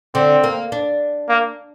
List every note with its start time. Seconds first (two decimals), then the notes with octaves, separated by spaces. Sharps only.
0.15 D3 C4
0.44 A#3
0.72 D4
1.29 A#3